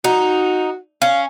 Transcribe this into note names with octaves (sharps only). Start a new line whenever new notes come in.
D#4 F#4
C#4 F5